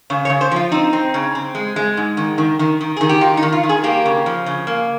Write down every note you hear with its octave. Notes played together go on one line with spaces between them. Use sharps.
C#3 C#5
C#5
C#3
C5
F3 F4
C4 D#4
C4
C#3
C4
G#3
G#3
G#2
D#3
D#3
D#3
D#3
D#3 G#4
G4
D#4 F4
D#4
D#3
F4
D#3
G#4
A#3 G4
C#3
F3
C#3
A#3